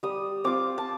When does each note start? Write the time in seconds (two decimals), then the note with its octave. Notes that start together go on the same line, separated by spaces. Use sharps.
0.03 G3 D#6
0.44 C4 F4 D6
0.78 A5